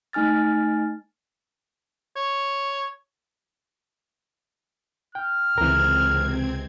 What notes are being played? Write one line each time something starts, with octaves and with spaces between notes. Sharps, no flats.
A3 D#4 G#5 F6 A6
C#5
G5 F6
C#2 C3 E3 C4 A#4 G#6